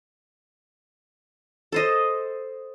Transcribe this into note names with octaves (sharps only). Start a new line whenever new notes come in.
A4 C5 D#5